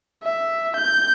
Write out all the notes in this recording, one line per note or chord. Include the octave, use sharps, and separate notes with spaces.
E5
G6